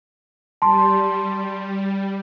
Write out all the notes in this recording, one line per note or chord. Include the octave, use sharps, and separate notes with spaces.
G3 A5 C6